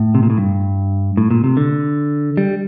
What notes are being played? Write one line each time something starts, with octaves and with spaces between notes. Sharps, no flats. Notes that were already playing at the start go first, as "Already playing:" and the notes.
Already playing: A2
C3
A#2
A2
G2
A2
A#2
C3
D3
G3